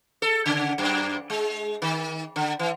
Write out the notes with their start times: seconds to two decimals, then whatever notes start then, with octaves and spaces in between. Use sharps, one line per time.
0.22 A4
0.46 C#3
0.78 F#2
1.30 G#3
1.82 D#3
2.36 D3
2.59 E3